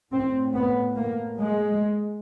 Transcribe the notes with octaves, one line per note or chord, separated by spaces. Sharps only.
A2 C4
B3
A#3
G#3